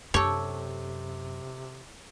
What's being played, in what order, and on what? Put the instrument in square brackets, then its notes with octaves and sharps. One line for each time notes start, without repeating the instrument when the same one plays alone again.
[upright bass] F#2 [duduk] C3 [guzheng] G4 A4 [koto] C#5